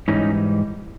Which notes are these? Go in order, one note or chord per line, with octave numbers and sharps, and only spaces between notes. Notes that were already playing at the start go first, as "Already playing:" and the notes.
G#2 E3 G3 C#4 D#4